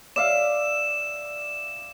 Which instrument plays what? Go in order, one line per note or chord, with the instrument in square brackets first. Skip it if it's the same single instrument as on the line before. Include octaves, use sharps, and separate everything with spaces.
[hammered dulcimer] D5 E5 F5 [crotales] E7